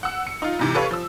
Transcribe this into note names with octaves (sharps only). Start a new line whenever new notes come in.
F#5 E6
C#7
D#4 F4
G#2 C3 E3
G4 A4 B4 C#5 F5
F3 E6